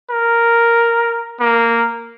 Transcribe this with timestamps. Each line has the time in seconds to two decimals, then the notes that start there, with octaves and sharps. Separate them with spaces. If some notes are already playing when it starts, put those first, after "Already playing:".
0.11 A#4
1.41 A#3